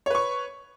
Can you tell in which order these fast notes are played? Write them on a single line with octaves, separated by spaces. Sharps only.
C#5 B4 C#6